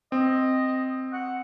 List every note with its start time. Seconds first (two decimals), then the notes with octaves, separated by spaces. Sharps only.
0.12 C4 D#5
1.13 F#5